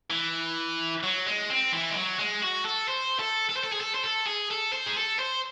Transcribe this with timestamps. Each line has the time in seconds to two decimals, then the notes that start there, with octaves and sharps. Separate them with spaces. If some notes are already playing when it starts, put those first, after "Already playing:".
0.10 E3
1.03 F#3
1.26 G#3
1.50 C4
1.72 E3
1.90 G#3
1.96 F#3
2.19 G#3
2.42 F#4
2.65 A4
2.88 C5
3.19 A4
3.50 A4
3.57 C5
3.64 A4
3.72 G#4
3.81 A4
3.95 C5
4.04 A4
4.26 G#4
4.50 A4
4.73 C5
4.86 G#4
4.97 A4
5.19 C5